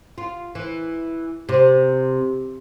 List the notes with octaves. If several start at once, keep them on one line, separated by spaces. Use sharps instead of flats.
F4
E3
C3